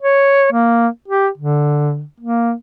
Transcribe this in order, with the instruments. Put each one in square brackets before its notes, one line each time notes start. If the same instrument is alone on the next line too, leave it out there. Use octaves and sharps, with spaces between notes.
[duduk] C#5
A#3
G4
D3
A#3